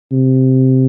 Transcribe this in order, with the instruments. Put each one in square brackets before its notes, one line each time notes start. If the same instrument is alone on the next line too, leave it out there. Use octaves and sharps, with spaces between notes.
[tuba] C3